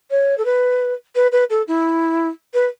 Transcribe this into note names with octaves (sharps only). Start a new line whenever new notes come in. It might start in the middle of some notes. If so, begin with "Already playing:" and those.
C#5
A4
B4
B4
B4
A4
E4
B4